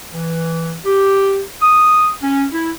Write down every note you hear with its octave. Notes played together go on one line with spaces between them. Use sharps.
E3
G4
D#6
C#4
E4